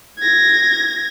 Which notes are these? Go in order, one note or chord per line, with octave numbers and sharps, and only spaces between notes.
G#6 A#6